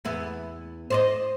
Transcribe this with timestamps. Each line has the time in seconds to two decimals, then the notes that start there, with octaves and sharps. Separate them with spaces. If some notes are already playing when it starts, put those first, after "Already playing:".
0.05 E2 B3 E4
0.90 C5 D5 D#5